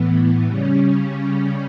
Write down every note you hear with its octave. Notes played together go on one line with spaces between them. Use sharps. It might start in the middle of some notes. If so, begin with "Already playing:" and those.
Already playing: A2 E3 B3
C#3 G3 C#4